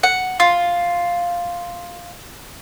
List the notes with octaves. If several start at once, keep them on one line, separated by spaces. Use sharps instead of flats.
F#5
F4